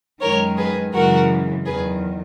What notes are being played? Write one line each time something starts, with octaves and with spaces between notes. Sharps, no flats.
F#2 D#3 G#3 A#4 C#5
G#4 B4
F#2 C#3 E3 G#3 F#4 A#4
E2 D#3 F#3 G#4 B4